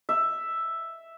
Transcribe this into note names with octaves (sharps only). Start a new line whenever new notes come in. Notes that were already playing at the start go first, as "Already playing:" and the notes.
E5